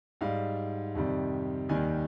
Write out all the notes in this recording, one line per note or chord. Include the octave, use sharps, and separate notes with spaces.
G#2 G3 F5
F2 C3 D#3 G3
D#2 D#3 G3 G#5